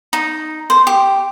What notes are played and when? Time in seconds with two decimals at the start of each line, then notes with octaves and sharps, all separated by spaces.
0.13 D#4
0.70 C5
0.87 G4